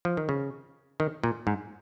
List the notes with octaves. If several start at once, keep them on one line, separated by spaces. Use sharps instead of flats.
F3
D#3
C#3
D#3
A#2
G#2